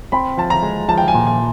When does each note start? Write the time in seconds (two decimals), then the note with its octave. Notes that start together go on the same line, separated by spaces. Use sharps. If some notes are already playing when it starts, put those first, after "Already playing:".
0.12 C4 B5
0.38 F3 A5
0.50 A#5
0.63 G#3
0.88 F3 A5
0.98 G5
1.08 G#5
1.15 A#2
1.27 G#5